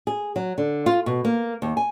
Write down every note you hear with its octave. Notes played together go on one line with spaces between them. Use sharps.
G#4
F#3
D3
F4
B2
A#3
D#2
G#5